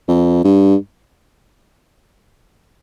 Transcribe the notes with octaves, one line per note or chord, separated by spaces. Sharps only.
F2
G2